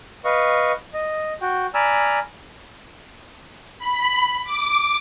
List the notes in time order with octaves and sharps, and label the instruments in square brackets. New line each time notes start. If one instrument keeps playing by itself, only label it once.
[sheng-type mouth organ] B4 D#5 F5 C#6
D#5
F#4 G5
D5 G#5 A#5 B5 E6 F6
[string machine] B5
D6